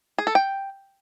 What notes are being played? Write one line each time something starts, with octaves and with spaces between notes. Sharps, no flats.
G#4
A4
G5